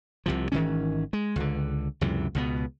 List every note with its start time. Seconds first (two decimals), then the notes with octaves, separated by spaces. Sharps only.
0.26 C2 C3 F3
0.52 G#1 D#3 E3 C#4
1.13 G#3
1.36 C#2 D3
2.01 C#2 F#2 C3 E3
2.35 C#2 B2 B3